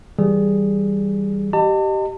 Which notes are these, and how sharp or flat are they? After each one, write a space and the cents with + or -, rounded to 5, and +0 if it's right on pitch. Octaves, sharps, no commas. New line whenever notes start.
E3 -20 G3 +0 G#4 +0
G4 -15 D#5 -20 A5 +40